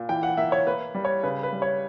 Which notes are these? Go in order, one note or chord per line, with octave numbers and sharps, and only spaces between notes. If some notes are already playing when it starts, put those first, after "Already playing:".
Already playing: A#2
E3 G5
F#5
A#3 E5
C#5
A#3 B4
G3
C#5
C#3 B4
B4
G3
C#5